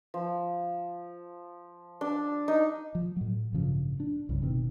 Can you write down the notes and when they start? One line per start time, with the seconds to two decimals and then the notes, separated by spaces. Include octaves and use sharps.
0.14 F3
2.01 D4
2.48 D#4
2.95 F3
3.16 A2 F#3
3.53 A1 G2 C#3 F3
4.00 D4
4.29 C2 G2 C#3
4.42 F1 B2 D#3 C4